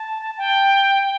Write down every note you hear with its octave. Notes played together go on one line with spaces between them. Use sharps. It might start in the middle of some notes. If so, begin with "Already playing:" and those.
Already playing: A5
G5